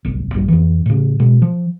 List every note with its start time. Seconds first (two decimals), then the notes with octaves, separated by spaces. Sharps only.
0.05 D1 G1 C2
0.34 A#1 G2 G3
0.48 F2 E3
0.86 A2 C#3
1.20 B2 G#3
1.42 F3